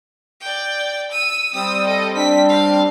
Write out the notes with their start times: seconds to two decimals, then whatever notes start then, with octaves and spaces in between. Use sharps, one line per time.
0.41 D5 G5
1.12 E6 D#7
1.54 G3 C4 D#6 E6
1.86 A4 D#5
2.16 D4 B6
2.49 F5